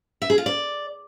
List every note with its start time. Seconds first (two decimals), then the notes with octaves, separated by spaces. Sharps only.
0.22 E5
0.30 G#4
0.38 F4
0.46 D5